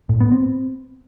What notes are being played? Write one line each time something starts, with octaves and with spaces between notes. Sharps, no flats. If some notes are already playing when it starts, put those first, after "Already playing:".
A2
B3
C4